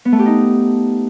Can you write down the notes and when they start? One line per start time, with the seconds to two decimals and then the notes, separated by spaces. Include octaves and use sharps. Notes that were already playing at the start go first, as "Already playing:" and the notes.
0.05 B3
0.12 A3
0.19 G4
0.26 D#4